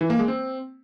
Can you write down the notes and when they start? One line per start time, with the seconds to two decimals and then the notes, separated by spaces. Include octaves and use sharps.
0.01 E3
0.10 A#3
0.19 G#3
0.28 C4